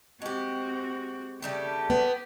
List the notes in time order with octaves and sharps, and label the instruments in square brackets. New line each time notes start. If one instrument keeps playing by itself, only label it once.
[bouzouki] G#3 G4 [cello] C4 F#4
[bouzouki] C#3 G3 A3 [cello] G4
[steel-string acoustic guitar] B3